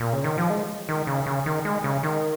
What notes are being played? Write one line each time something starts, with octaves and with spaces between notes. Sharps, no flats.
A#2
C#3
D#3
F3
G#3
D#3
C#3
C#3
D#3
G#3
C#3
D#3